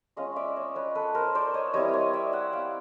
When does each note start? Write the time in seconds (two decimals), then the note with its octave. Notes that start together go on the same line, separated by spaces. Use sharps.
0.16 G#3 C#4 F4 D#5 F5
0.36 D5 E5
0.56 C#5 D#5
0.75 B4 C#5
0.95 A4 B4
1.15 A#4 C5
1.35 C5 D5
1.54 C#5 D#5
1.73 G3 C4 E4 C#5 D#5
1.93 C#5 D#5
2.13 D5 E5
2.33 E5 F#5
2.53 F5 G5